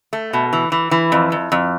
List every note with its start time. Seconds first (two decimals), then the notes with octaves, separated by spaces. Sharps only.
0.13 A3
0.33 B2
0.53 E3
0.72 E3
0.91 E3
1.12 F2
1.32 F2
1.52 F2